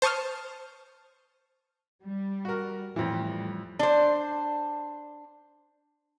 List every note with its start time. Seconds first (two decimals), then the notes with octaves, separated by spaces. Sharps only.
0.02 C5 A5 C#6 D#6 F6
2.05 G3
2.45 F#4 A#4
2.96 F2 A2 E3 G3
3.79 D4 C5